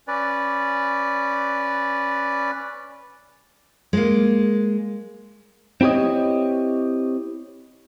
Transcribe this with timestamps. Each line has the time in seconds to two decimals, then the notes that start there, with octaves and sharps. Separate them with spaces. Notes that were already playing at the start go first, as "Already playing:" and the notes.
0.08 C#4 B4 D5
3.93 G#3 A#3
5.81 C4 E4 G4 C#5 D#5